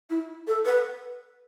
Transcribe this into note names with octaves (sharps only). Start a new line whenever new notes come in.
E4
A4
B4